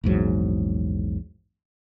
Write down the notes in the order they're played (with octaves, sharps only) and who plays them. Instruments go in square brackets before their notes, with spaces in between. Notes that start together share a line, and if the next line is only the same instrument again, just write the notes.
[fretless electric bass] A#1 E2 G#2 F#3